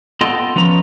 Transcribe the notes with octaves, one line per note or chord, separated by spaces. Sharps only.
B3 F4 A4 D#5 G5
F3 C#4 B4 A#5